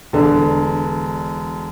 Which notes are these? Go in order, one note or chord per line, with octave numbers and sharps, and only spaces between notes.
E1 D3